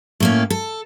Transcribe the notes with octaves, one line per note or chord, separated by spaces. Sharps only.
A2 A#3 C#4
A4